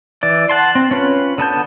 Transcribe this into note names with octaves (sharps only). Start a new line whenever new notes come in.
E3 D5
F#5 A5 C6
C4
C#4 F4 B4
D3 B3 A5 G6